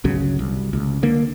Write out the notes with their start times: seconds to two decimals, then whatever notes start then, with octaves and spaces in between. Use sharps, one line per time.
0.04 G1 C#2 C#3 F#3
0.39 C2
0.73 C#2
1.03 D3 A#3